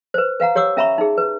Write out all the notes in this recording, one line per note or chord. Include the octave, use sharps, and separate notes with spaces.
B4 C5
B4 F5 F#5 A#5
G4 C#5 F#5 D6 E6
C#4 E5 A#5 B5 C#6
D#4 G#4
B4